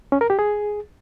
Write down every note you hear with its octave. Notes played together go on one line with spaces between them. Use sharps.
C#4
A#4
G4
G#4